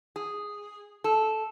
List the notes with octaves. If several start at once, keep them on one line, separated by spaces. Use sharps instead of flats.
G#4
A4